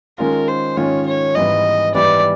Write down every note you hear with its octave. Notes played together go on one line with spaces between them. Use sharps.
D#3 G#3 C#4 F4 A#4
C5
D#3 G#3 C#4 F4 C#5
C#5
G#2 E3 G3 B3 D#5
G#2 E3 G3 B3 D5